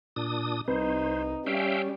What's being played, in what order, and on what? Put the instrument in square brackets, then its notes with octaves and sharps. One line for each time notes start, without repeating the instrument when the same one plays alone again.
[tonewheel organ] A#2 D4 D#6
[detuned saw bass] C2 [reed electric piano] C4 B4 [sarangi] D#4 [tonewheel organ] C5
[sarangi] G3 [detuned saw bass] C#4 [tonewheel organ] E5 F5 G5